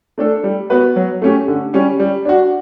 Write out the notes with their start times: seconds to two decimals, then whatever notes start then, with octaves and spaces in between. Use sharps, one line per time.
0.18 A3 D4 A4
0.44 G3
0.70 B3 F#4 B4
0.96 F#3
1.22 A3 C#4 G4
1.48 D3
1.73 G3 C#4 G4
2.00 G3
2.25 D4 F#4